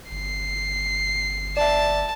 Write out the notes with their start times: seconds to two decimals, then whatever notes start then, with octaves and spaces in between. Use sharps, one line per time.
0.12 G1 C7
1.57 D5 E5 A5